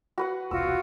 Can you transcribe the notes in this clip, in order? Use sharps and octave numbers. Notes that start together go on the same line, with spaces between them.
F#4 B4 F#5
E1 C2 F4 F#4 E6